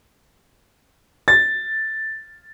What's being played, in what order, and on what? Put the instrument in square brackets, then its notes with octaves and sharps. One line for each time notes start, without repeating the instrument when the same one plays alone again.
[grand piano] A6